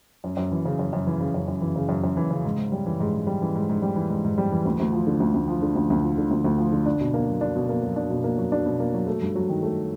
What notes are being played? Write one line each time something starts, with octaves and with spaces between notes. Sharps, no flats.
F#2
F#2
E3
C#3
F#2
F#2
E3
C#3
F#2
F#2
E3
C#3
F#2
F#2
E3
C#3
G#2
G#2
G3
E3
G#2
G#2
G3
E3
G#2
G#2
G3
E3
G#2
G#2
G3
E3
D2
D2
F3
D3
D2
D2
F3
D3
D2
D2
F3
D3
D2
D2
F3
D3
D4
B2
A#3
F#3
D4
B2
A#3
F#3
D4
B2
A#3
F#3
D4
B2
A#3
F#3
A3
G2
F#3
D#3
A3